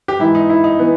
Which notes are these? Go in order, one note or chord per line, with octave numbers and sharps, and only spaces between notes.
G4
G#2 E3 E4
D#4
E4
D#4
E3 B3